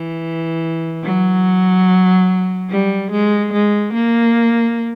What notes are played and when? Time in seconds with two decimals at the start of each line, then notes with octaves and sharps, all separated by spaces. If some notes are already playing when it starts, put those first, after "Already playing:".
Already playing: E3
1.04 F#3
2.70 G3
3.11 G#3
3.52 G#3
3.93 A#3